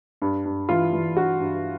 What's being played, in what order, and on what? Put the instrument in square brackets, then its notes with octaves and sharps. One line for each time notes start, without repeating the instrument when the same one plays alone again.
[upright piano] G2
G2
E3 F4
E3
G2 F#4
G2